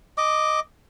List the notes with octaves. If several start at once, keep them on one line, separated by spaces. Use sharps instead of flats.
D#5 D6